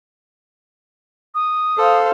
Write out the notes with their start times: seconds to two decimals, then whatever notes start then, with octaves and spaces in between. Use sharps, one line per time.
1.35 D#6
1.78 A4 C5 F5